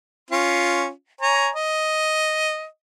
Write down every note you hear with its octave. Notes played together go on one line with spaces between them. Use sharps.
C#4 F4
C#5 G#5 A#5
D#5